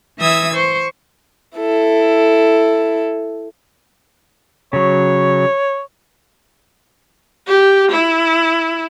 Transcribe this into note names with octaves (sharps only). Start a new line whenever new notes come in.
E3 E5 D#6 E6 G#6
C5 C#6
E4 A4
C#3 F#3 C#5
G4
E4